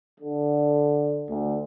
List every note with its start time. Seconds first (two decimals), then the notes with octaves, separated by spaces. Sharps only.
0.20 D3
1.29 D2